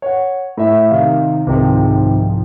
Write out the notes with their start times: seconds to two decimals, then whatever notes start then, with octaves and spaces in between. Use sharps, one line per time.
0.02 C#5 F#5
0.57 A2 E5
0.91 C3 D#3 F5
1.47 C2 G#2 C3 D#3 F3 G#3